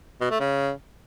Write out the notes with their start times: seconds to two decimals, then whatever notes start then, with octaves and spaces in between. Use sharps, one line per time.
0.21 B2
0.30 A3
0.40 C#3